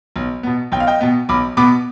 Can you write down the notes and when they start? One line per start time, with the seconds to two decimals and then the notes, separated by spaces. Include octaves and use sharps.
0.16 B1
0.43 B2 B3
0.72 B1 G5
0.80 F5
0.87 D#5 G5
1.01 B2 B3
1.29 B1 B5 D6
1.57 B2 B3 B5 D6